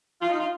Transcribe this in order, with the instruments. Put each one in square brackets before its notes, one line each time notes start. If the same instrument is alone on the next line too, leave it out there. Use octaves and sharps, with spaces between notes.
[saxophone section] F4
D#4
F4